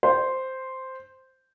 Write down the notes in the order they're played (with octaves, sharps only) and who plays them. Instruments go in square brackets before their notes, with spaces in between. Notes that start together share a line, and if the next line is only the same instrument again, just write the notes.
[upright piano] C5